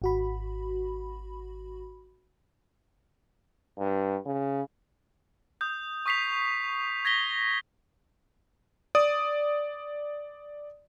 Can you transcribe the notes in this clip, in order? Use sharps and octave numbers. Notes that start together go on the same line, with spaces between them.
G#1 F#4 B5
G2
C#3
D#6 G6
C#6 D#6 B6 C7 F7
G#6 A#6 B6 G7
D5 D#6